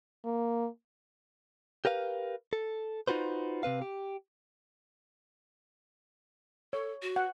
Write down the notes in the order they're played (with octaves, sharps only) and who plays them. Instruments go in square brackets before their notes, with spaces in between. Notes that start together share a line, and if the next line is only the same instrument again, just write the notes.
[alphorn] A#3
[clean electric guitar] G4 A#4 B4 F5
A4
D#4 F4 F#4 B4 C5
C3 C4 B4 F5
G4
[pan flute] A4 [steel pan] C#5
[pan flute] F#4
[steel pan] F#5